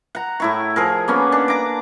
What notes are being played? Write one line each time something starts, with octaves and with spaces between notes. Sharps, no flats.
F#5 A#5
A2 E4 C#6
F3 G#4 A#4
A#3 B3 C#4
D4
A#5 D6